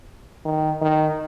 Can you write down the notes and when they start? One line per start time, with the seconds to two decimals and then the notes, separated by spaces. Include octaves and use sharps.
0.45 D#3
0.81 D#3